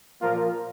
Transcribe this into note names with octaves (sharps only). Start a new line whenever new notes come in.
A#2 F3 A#3 F4 A#4